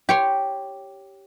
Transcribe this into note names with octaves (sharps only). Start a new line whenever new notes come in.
G4 C#5 C6